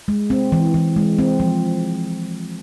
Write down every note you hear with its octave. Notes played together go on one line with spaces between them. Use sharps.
G#3
C4
E3
E3
G#3
C4
F3